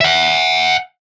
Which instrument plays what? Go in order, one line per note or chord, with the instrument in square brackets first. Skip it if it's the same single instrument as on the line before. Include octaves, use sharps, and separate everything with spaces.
[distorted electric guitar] E5 F#5